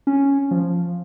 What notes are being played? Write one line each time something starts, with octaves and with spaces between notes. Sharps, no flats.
C#4
F3